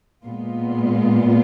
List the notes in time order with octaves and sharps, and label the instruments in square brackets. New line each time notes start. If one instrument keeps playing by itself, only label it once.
[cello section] A#2 G#3 B3 F4